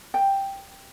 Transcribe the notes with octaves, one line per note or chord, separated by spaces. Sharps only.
G5